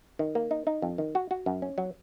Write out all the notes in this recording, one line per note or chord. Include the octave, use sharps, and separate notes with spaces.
D#3
A#3
D#4
D#4
F2
D#3
F#4
F#4
F#2
C#4
F#3